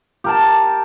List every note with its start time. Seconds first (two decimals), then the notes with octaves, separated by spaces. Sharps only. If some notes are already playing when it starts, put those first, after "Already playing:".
0.24 G4 A#4 A5